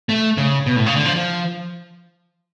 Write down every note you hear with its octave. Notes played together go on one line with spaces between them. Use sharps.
A3
C#3
B2
A2
C#3
D3
F3
F3